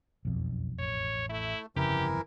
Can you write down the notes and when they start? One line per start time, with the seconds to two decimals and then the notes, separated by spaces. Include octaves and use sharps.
0.25 E1 B1 F2
0.79 A1 C#5
1.29 A3 E4
1.76 G1 F2 C#3 E3 E4 G4 A#4